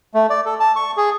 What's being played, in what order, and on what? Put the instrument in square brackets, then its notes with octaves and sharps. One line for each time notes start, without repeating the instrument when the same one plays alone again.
[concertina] A3
D5
A4
A5
C#6
G#4